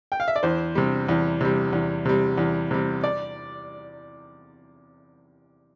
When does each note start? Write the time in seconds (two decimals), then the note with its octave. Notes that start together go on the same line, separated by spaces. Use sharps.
0.12 G5
0.20 F5
0.28 E5
0.36 D5
0.43 E2 C5
0.75 C3 G3
1.09 E2
1.41 C3 G3
1.73 E2
2.05 C3 G3
2.38 E2
2.71 C3 G3
3.04 D5